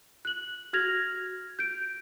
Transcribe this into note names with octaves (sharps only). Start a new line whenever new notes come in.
F#6 F#7
F#4 F6 G#6 A#6 F7
G6 D7